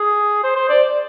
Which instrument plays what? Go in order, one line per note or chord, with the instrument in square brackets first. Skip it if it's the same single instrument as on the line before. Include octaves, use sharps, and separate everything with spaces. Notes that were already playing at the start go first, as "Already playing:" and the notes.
Already playing: [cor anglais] G#4
C5
C5
D5